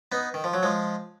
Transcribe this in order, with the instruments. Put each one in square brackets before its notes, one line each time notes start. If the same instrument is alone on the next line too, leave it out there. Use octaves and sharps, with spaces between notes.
[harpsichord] B3 D#4
D#3
F3
F#3
F3 G#3